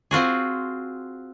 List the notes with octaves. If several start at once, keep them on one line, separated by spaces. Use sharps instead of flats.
C4 F4 F#4 G#4